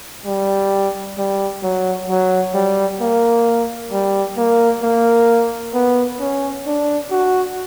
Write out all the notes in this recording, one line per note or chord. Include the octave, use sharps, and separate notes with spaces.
G3
G3
F#3
F#3
G3
A#3
G3
A#3
A#3
B3
C#4
D4
F#4